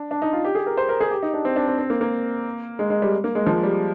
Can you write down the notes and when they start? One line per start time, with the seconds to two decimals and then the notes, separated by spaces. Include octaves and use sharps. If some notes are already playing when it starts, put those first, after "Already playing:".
Already playing: D4
0.11 D4
0.22 D#4
0.33 F4
0.45 G4
0.55 G#4
0.67 A#4
0.77 C5
0.89 A#4
1.01 G#4
1.11 G4
1.22 D#4
1.34 D4
1.45 C4
1.56 D4
1.68 C4
1.79 C4
1.90 A#3
2.01 A#3
2.79 G#3
2.90 G#3
3.02 G3
3.24 A#3
3.35 G#3
3.47 F3
3.63 G3